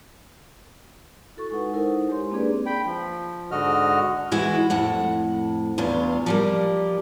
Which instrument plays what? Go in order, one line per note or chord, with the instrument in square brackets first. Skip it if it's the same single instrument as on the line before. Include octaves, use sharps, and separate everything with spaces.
[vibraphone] E4 F#4 A4 C#6
G#3 D#4 B4 F#5
D#4 E4 A4 A#4 C5
G#3 G4 C#5 C6
A#3 C4 D4 G#4 B4 D5
[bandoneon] G5 B5
F3
G#2 D3 F#4 D#5 F6
[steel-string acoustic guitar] E3 G#3 E4 F#4
F2 A2 F#5
E2 G2 F4 C#5
F3 G3 A#3